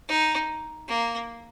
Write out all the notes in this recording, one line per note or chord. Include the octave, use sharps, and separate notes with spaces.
D#4
A#3